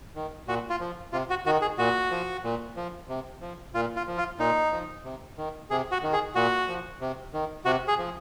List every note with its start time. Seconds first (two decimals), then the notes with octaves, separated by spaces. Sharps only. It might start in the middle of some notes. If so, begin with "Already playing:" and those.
0.15 D#3
0.47 A#2 F#4
0.70 F4
0.80 F3
1.12 C3 F4
1.30 F#4
1.46 D#3 F#4
1.62 G#4
1.78 A#2 F#4
2.11 F3
2.44 A#2
2.76 F3
3.09 C3
3.42 F3
3.74 A#2 F4
3.96 F4
4.07 F3
4.18 F4
4.39 A#2 D#4
4.72 F3
5.04 C3
5.37 D#3
5.70 C3 G#4
5.92 F#4
6.03 D#3
6.13 G#4
6.35 A#2 F#4
6.68 F3
7.01 C3
7.33 D#3
7.65 C3 F#4
7.88 G#4
7.98 F3